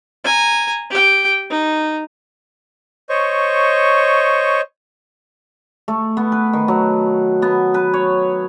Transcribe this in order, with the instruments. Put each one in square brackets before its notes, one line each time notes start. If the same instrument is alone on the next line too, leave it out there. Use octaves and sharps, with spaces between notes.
[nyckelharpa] G#5 A#5
G4 G5
D#4
[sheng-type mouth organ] C5 C#5 D#5 C#6
[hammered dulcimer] A3
B3
B4
D#3
F#3
B3
B4
C#5